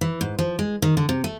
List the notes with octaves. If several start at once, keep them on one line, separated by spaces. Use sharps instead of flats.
E3
G#2
F3
G#3
D#3
D3
C3
A3